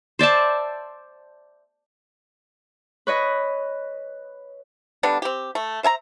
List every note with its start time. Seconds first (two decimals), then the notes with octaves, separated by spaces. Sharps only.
0.19 C5 D5 E5 A5
3.07 B4 C#5 D#5 B5
5.03 D3 G3 B3 D4
5.22 C4 G4
5.55 A3
5.83 C5 E5 G#5 A#5